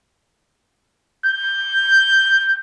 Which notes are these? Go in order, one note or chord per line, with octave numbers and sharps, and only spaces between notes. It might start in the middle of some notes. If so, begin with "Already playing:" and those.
G6